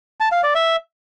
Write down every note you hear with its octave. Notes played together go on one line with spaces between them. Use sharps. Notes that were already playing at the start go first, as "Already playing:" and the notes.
A5
F5
D5
E5